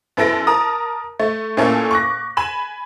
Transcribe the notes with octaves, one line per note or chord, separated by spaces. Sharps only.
F#2 B3 E4 A4 A#6 D7
A#4 A5 A#5 D#6
A3
A#2 A3 A#3 C#4 E4 A4
C#6 D6 F#6 A#6
G#5 B5 E7